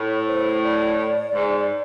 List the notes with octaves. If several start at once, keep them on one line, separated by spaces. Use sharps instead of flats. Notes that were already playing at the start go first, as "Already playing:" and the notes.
Already playing: A2
C#5
C5
C5
D5
G#2